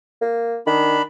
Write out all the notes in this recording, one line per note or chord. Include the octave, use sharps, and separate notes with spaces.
A#3
D#3 D4 B5